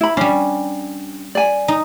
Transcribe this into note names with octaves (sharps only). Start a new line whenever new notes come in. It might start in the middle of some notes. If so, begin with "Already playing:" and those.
E4 B5
G3 C#4 D4
D5 G#5
D#4